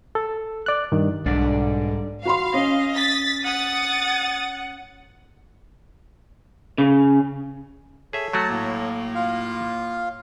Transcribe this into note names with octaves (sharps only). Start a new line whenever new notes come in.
A4
D5 F#6
G2 D#3
B1 G#2 D3 G3 D4 D5
F#4 F5 B5 C6
C#4 D#5
A6 B6
F#5 D#6 A6
C#3
G#4 A4 C#5 E5
F#3 A3 F#4 A5
A2 A#3
F4 F5